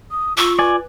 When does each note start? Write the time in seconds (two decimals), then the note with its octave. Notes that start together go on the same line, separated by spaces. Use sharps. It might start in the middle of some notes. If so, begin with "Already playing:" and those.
0.11 D#6
0.37 F4 C#6 E6
0.59 B4 D5 G#5